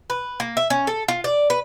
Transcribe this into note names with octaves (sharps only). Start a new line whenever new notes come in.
B4
A#3
E5
C#4
A4
F4
D5
B4